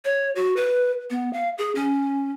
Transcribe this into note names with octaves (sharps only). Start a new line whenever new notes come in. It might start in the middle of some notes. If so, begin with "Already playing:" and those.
C#5
F#4
B4
B3
F5
G#4
C#4